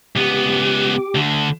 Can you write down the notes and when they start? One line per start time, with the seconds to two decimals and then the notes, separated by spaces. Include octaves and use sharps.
0.16 C#2 B3 G4 D6
1.15 D2 D3